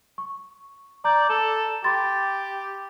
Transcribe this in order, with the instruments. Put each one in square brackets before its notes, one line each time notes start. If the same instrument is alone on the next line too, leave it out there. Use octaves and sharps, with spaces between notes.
[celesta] C#6
[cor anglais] D5 [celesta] A#5 G6
[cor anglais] A4
[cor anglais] G4 [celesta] B5 C6 A6